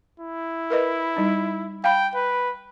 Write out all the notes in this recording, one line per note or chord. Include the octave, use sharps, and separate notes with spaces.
E4
A#4 B4 D#5
G3 D#4
F5 G5 B5
B4